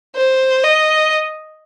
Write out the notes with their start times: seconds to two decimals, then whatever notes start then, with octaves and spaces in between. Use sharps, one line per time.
0.15 C5
0.63 D#5